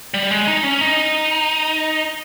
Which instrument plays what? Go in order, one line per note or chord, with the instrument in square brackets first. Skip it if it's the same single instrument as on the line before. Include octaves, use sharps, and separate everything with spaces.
[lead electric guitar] G3
G#3
D#4
C#4
D#4